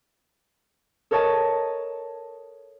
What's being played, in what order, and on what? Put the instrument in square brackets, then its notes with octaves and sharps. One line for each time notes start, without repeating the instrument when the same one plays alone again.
[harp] A4 A#4 C#5 D#5 A5